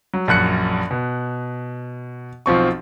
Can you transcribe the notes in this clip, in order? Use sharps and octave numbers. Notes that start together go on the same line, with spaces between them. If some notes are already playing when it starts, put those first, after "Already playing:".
F#3
A#1 F#2 F#6 C#7
B2
B1 F3 C4 C#6